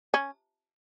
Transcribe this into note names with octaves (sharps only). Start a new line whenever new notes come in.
C#4